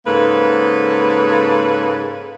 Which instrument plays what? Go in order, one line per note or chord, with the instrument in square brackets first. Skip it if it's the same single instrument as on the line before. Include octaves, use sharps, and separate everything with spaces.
[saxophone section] G#2 C#3 A#3 A4 B4